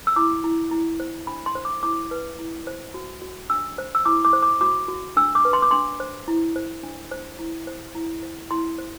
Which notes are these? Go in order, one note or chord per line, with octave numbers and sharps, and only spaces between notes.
E6
E4 D6
E4
E4
C5
D4 B5
C6
C5
D6
E4 D6
B4
E4
C5
F#4
F#4
D4 E6
C5
E6
E4 D6
D6
C5
D6
F#4 D6
F#4
D4 E6
D6
B4
C6
D6
D4 C6
C5
E4
C5
D4
C5
E4
C5
E4
C5
E4 C6
C5